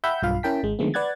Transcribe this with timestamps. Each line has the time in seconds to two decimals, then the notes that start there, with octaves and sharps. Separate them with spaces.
0.04 E5 F#5 G5 B5 E6 G6
0.22 B1 G2 F4 F5 B5
0.43 C#4 E4 A#4 G5 A5 B6
0.63 G#1 G#3
0.79 D3 D#3 F3 G#3 A3 B3
0.94 B4 D5 F#5 F#6 G#6 A6